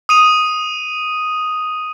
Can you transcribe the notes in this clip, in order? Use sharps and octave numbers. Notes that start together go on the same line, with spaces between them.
D#6 D#7 F7